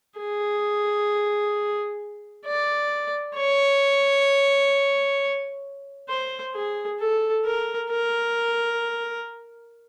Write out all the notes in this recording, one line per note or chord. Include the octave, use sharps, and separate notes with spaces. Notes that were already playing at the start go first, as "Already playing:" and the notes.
G#4
D5
C#5
C5
G#4
A4
A#4
A#4